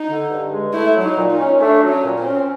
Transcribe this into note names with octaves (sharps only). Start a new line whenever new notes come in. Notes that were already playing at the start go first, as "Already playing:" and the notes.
Already playing: D#4
D3
G2
G#3
A3 E4
F#3
D#4
A#2
D#4
C#4
A3 D4
F#3
C#4
A#2
C4
C#4